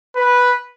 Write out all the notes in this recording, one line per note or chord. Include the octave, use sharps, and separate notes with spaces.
B4